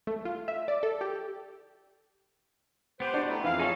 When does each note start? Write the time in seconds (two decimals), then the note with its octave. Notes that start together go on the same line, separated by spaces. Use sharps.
0.07 A3
0.25 F4
0.48 E5
0.68 D5
0.83 A4
1.01 G4
3.00 B3 G4 B4 C5
3.14 D4 F#4 D5
3.29 A3 E4 A#5 B5
3.44 F2 E3 F5
3.59 D#4 G#4 A4 C#5